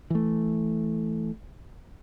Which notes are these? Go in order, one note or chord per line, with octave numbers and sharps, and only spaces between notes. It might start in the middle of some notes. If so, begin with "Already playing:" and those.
E3 A3